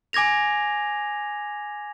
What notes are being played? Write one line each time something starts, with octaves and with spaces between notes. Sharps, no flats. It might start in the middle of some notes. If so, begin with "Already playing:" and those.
G#5 D6 G#6 A#6 F7